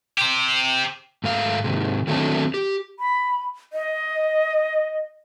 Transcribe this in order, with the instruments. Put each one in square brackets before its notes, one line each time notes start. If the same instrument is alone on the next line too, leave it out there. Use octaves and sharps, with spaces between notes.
[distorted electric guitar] G4 C5
[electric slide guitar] G#2 A3 F5
G#2 C3 D#3
D#3 F#3 A3 C4 D4
G4
[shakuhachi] B5
D#5